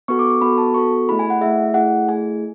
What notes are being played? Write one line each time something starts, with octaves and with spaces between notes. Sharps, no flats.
B3 F#4 A4 C#6
D6
C#6
B3 F#4 A4 B5
A5
B3 F#4 A4 C#6
A3 E4 G#4 B5
G#5
F#5
A3 E4 G#4 E5
A3 E4 G#4 F#5
A3 E4 G#4 G#5